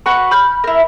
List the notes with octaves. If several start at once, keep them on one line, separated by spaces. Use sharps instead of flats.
F#4 B4 C#6
B5 F6 G6
E4 A#4